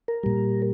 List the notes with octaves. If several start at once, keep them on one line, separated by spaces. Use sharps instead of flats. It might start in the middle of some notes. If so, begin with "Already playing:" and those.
A#4
A#2 G3